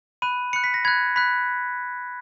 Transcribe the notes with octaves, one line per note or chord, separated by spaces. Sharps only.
B5 F#6 D#7
B5 F#6 C#7
B6
A#6
B5 F#6 G#6
B5 F#6 B6